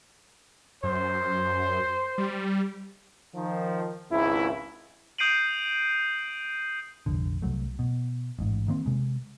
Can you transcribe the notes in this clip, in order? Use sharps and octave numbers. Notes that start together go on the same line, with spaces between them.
F#2 C5
G3
D#3 F3
G#1 C#2 E4
D#6 G6 C7 D7 D#7 F#7
F1 A#1 D3
C2 F#2 F#3 A3
B2
A1 G#2
D#3 A#3 C4
C3 G#3